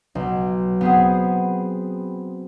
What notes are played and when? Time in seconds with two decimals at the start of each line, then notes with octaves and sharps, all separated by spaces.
0.15 B1
0.81 B3 C4 G#4